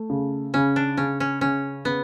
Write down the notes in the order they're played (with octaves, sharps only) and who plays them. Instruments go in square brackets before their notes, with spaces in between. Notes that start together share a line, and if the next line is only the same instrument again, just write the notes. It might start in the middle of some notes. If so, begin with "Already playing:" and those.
Already playing: [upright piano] A3
C#3
[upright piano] C#3 [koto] C#4
[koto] D4
[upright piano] C#3 [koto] C#4
[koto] C#4
[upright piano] C#3 [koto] C#4
[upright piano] C#3 [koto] B3